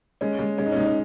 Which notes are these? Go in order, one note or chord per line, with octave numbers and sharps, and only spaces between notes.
G#3 C#4
G#3
G#3 C#4
D#4
C#4
G#3 D#4
C#4